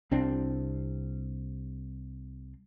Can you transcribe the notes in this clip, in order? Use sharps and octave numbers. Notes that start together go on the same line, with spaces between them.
C2 C4 D4